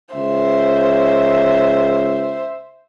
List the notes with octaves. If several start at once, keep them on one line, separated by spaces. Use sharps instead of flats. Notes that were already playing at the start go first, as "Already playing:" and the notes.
C#2 C5 E5